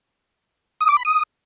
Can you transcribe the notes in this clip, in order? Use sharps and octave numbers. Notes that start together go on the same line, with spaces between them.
D#6
D6
B5
D#6